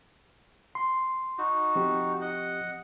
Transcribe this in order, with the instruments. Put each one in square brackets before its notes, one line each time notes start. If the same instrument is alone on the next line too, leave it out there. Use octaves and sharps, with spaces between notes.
[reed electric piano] C6
[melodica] D#4 F#4
[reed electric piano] F3 C4 G4
[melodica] D#5 F#5